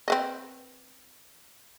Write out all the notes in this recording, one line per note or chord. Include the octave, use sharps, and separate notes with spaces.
C4 B4 D#5